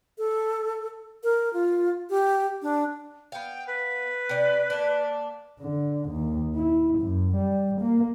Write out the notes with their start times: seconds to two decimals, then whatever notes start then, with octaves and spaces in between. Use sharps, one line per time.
0.18 A4
1.24 A#4
1.53 F4
2.10 G4
2.62 D4
3.32 B3 F5 G5
3.67 B4
4.29 C3 D5
4.70 A#3 D4
5.60 D3
6.10 D#2
6.56 E4
6.99 F#2
7.36 G3
7.81 A#3